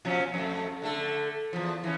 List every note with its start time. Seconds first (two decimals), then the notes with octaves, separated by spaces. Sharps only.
0.05 A#2 F3 C#4
0.34 F2 A3
0.82 D3 A3 A4
1.53 E2 F3
1.84 E3 C#4